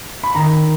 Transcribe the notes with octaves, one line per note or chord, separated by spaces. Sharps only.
B5
D#3 A#5